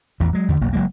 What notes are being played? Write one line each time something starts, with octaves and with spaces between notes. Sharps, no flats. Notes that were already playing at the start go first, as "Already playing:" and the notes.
A1 E2 E3
F#3 G#3
E2 D3
E1 B1 F#3 A#3
F#1 F#3 G#3 A#3